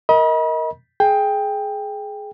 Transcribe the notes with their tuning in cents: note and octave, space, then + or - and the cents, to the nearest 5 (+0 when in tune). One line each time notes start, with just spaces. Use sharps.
A#4 +0 D#5 +25 B5 -40
G#4 +20 G5 +15